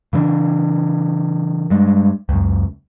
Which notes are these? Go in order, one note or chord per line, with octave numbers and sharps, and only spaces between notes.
C#3 E3 C4 D4
G2 G#3
C#2 F#2